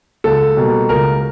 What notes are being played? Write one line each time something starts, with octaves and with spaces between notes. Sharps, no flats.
C#2 A4
B2 G3 A#3
C#2 A#4